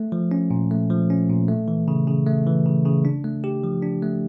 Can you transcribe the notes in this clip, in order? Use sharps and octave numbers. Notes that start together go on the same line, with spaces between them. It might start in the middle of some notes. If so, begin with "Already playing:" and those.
Already playing: A3
F3
C#4
A#2
A3
F3
C#4
A#2
A3
E3
C#3
C#3
A3
E3
C#3
C#3
D4
A3
G4
F3
D4
A3